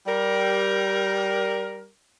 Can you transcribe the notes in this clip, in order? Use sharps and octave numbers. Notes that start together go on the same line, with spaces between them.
G3 A#4